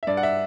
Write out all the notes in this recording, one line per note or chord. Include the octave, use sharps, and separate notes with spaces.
E5
G2 D5
F#5
E5